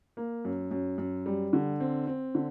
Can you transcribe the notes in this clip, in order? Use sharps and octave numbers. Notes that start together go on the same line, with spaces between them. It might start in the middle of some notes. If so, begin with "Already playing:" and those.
A#3
F#2
F#2
F#2
G3
D3
C4
C4
D3